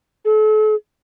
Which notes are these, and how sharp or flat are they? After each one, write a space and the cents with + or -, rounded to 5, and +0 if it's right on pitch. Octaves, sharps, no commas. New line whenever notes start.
A4 -40